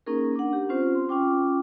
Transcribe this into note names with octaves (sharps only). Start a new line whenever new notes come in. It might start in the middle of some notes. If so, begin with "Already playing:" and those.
A#3 C#4 D#4 G#4 A#4
D4 F#5
G4
C4 C#4 F4 C5
C6
C#4 F4 G5 D6